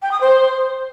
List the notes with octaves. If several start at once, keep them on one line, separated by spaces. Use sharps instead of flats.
G5
D#6
C5